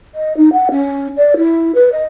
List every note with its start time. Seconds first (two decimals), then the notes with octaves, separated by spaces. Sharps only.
0.15 D#5
0.37 D#4
0.53 F#5
0.71 C#4
1.17 D5
1.37 E4
1.75 B4
1.92 D#5